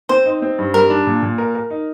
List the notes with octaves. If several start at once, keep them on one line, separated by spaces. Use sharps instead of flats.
C4 C5
D#4
C4
G2
G3 A#4
D4
A#2
A#2
A#4
A#4
D#4